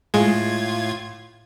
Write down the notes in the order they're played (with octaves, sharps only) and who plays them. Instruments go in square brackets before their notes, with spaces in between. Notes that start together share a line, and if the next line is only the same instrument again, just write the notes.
[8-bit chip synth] A2 F4 G#6 [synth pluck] G#3